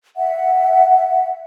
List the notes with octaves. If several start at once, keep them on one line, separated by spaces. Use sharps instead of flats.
E5 F#5